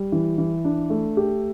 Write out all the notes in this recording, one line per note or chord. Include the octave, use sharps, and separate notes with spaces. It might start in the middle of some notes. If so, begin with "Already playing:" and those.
Already playing: G3
E3
E3
D4
A3
G4